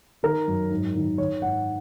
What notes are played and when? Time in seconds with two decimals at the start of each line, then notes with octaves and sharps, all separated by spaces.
0.23 D#3 A#4
0.47 F#2
0.71 G#2
0.95 D#3
1.18 D#3 C#5
1.42 G#2 F#5